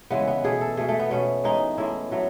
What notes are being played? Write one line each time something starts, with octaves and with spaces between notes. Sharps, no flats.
C#3 E3 G#3 B3
B3
B2 A3 G#4
A4
B2 A3 G#4
A3
B3
B2 A3 C#4
A2 E3 G#3 D#4
A2 G#3 E4
A2 F#3 A3